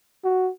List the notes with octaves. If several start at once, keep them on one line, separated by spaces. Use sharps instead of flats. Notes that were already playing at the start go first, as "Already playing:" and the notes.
F#4